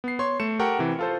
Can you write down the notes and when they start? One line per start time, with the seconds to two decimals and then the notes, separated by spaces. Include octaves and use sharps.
0.04 B3 C7
0.19 C#5 C6
0.40 A3 C#7 E7
0.59 G4 A4 A#4 F#5 G5 C#6
0.79 C3 E3
0.99 F4 A4 C5